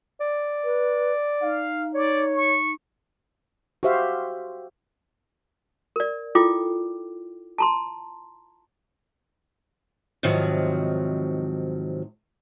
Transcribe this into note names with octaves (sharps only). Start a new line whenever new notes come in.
D5
B4
D#4 F5
C#5 D5
C#6
F#4 G4 C5 E5 F5
A#4 D5
E4 F4 A4 G5 D6
A5 A#5 C6
G#2 C3 D#3 F3 F#3